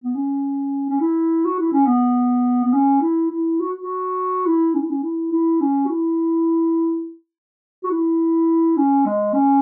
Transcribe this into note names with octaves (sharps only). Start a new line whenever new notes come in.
B3
C#4
C#4
E4
F#4
E4
C#4
B3
B3
C#4
E4
E4
F#4
F#4
E4
C#4
E4
C#4
E4
E4
C#4
F#4
E4
F#4
E4
C#4
G#3
C#4